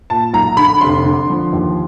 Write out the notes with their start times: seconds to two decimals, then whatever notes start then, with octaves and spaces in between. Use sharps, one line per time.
0.10 A#2 A5
0.34 B1 A#5
0.57 D3 B5
0.81 F1 C6
1.05 D3
1.30 F3
1.53 D#2